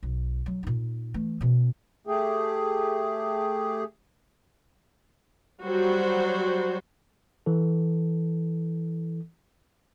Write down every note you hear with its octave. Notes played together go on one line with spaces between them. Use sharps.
B1
F#3
A#2 D#4
E3 A3
B2 C#4
A3 G4 G#4
F#3 G3 F#4 C5
E3 A4